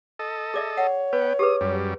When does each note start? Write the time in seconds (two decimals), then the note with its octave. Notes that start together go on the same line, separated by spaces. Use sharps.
0.19 A4 D#5
0.54 G#4 D5 E5
0.77 C#5 F#5
1.13 B3 B4 G5
1.39 G4 G#4 B4 D#6
1.61 F#2 G3